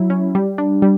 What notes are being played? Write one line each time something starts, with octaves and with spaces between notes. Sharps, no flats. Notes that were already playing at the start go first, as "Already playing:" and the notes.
Already playing: F#3 E4
C#4
G3
D4
G3